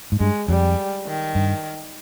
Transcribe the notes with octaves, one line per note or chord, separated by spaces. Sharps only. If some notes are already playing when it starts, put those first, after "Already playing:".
G#2
G2 G#3
F2 G3
D#3
G2